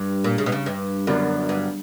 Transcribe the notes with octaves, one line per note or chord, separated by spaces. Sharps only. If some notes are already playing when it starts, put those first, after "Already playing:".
Already playing: G2
A#2
C#3
B2
C#3
G2
F#2 D3 F#3 B3 D4 A#4
G2